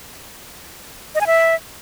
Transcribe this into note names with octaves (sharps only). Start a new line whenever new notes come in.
D#5
G#5
E5